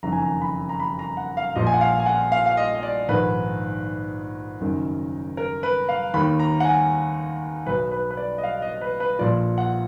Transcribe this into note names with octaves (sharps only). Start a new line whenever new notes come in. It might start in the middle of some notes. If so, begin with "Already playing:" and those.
F#1 F2 D#3 A#5
G#5
A#5
B5
A#5
B5
A#5
F#5
F5
A#1 A#2 F3 D#5
G#5
F#5
F5
G#5
F#5
F5
F5
D#5
D#5
D5
A#1 G#2 D#3 B4
F#1 F#2 D#3
A#4
B4
F5
D#2 D#3 B5
A#5
F#5
G#5
B1 B2 B4
B4
B4
D5
D#5
F5
D#5
B4
B4
A#1 A#2 F3 D5
F#5